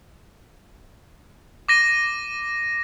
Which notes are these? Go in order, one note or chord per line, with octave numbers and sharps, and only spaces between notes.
D6 A#6 D#7